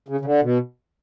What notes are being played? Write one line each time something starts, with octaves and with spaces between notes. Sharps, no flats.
C#3
C#3
D3
B2